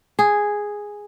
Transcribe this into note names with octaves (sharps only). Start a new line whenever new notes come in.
G#4